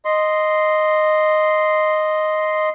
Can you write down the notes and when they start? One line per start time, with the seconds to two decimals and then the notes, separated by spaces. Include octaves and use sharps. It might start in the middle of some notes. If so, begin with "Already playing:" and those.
0.05 D#5 C6